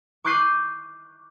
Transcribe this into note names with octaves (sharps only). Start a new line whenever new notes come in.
C#6 D6 F#6 G6 C7 D#7